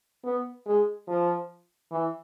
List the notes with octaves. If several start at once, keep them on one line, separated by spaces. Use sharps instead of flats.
B3
G#3
F3
E3